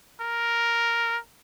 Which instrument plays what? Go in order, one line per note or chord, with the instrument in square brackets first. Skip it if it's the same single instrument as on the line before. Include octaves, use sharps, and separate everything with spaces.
[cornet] A#4